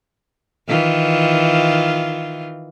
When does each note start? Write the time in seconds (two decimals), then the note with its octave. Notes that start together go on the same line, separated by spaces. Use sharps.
0.68 D#3 E3 F4